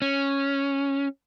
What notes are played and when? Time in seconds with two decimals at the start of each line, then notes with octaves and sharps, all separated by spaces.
0.02 C#4